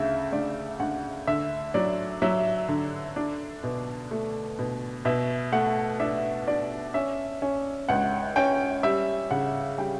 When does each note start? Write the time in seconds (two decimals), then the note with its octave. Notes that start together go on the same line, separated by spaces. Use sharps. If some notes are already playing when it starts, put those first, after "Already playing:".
Already playing: D2 C#3 E5
0.32 D2 D5
0.80 D2 F#5
1.27 D3 E5
1.74 F#3 D5
2.22 F#3 E5
2.68 D3
3.16 D4
3.63 B2
4.11 A3
4.59 B2
5.05 B2 E5
5.52 A3 F#5
6.00 D4 E5
6.47 D4 D5
6.94 C#4 E5
7.42 C#4
7.89 C#2 F#5
8.36 C#4 G5
8.83 G3 E5
9.31 C#3 F#5
9.78 G3 G5